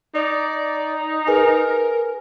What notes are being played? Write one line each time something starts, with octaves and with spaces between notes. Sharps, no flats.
D#4 D5
G#4 A#4 B4 G#5